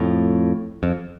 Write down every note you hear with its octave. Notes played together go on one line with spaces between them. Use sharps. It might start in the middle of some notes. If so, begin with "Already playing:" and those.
Already playing: F2 A2
F2